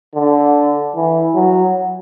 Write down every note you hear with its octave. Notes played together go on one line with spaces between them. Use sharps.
D3
E3
F#3